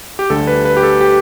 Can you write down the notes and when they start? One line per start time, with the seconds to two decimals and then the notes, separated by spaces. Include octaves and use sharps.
0.19 G4
0.30 D2 D3 G3 A4
0.47 B4
0.65 B4
0.77 G4
0.83 A4
1.01 G4